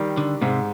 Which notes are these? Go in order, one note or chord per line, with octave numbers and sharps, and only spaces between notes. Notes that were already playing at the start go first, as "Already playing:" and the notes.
Already playing: D#3 G3
D3
G#2 C3